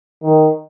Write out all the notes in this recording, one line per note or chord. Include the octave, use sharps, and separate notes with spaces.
D#3